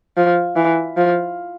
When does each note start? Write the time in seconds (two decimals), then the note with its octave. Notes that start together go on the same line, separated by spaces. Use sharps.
0.17 F3
0.56 E3
0.97 F3